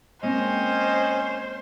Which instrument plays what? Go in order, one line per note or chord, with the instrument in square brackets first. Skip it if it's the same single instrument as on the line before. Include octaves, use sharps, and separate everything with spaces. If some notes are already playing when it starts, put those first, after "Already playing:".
[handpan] G#3 A#3 C4 [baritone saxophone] C#4 [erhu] C5 [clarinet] D#5